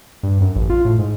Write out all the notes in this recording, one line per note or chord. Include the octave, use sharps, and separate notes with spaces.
G2
F#2
A1
F4
A2
G#2